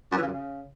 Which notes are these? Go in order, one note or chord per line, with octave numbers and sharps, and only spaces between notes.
F#2
E3
C#3
F#2
C#3